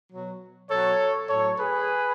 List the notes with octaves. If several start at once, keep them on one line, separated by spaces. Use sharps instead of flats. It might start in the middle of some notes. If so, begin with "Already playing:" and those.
B2 F#3
B2 F#3 A4 C#5
A2 F#3 A4 C#5
G#4 B4